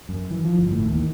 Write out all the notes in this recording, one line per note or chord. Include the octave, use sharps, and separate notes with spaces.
F#2
E3
F3
G1
A2
D#2
D#3